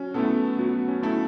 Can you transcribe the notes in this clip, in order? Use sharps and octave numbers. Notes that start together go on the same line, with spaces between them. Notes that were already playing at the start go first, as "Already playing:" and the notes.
Already playing: F#3 C#4
A3 B3 E4 A4
F#3 B3
C#4
A3 E4 A4